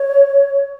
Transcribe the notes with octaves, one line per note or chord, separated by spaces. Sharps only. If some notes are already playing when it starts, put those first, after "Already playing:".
Already playing: C#5